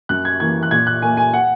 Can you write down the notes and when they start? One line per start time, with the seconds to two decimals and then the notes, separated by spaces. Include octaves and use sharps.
0.09 F#2 F#6
0.25 G#6
0.40 E3 A#3 G#6
0.63 F#6
0.71 A#2 G#6
0.87 F#6
1.02 A#3 G#5
1.17 G#5
1.33 F#5